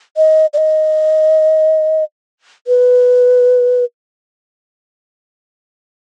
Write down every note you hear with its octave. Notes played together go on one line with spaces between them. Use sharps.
D#5
D5
D#5
B4